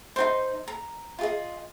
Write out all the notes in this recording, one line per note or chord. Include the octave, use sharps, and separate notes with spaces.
D#4 F#4 C5 C6
A#5
F4 G#4 D#5